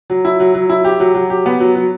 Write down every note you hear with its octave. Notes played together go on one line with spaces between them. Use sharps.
F#3
E4
F#3
F#3
E4
G4
F#3
F#3
G4
B3
F#3
F#3